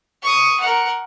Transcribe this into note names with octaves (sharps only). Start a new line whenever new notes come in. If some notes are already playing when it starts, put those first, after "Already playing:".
C#6 D#6
A#4 F#5